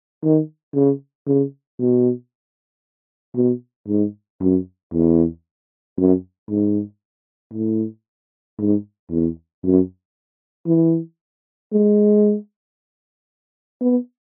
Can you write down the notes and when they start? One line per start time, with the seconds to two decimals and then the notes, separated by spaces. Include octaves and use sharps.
0.23 D#3
0.75 C#3
1.27 C#3
1.80 B2
3.36 B2
3.88 G#2
4.41 F#2
4.93 E2
5.98 F#2
6.50 G#2
7.54 A2
8.59 G#2
9.11 E2
9.64 F#2
10.67 E3
11.73 G#3
13.81 B3